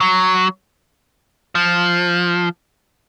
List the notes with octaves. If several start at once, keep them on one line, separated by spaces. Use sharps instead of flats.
F#3
F3